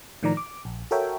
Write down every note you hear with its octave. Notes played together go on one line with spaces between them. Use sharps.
A2 D#3 F3 D5 A#5
D6
A#1
F#4 A4 A#4 C#5 E5 G5